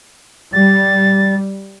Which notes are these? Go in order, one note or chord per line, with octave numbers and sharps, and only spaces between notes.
G3 A6